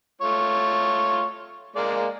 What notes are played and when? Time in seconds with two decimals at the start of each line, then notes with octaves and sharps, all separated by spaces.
0.21 A3 F4 C#5
1.76 G#3 A#3 D5